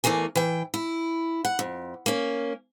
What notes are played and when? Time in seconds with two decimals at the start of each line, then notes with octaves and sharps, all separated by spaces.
0.04 E2 E3 A3 A#3 G#5
0.36 E3 G5
0.74 E4
1.45 F#5
1.59 F2
2.06 A#3 C#4